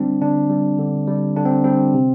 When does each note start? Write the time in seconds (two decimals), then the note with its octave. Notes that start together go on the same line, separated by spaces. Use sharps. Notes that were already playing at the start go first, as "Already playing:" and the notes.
Already playing: D3 G3 C4 D4
0.21 D3 D4
0.50 G3
0.79 D3
1.07 G3
1.37 D3 D4
1.45 C4
1.64 G3 C4
1.94 C3